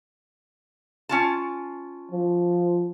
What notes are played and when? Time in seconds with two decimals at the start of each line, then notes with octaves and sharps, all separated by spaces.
1.09 C#4 F4 A5
2.12 F3